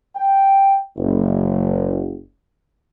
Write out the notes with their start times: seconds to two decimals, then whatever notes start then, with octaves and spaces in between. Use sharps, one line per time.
0.16 G5
0.97 F#1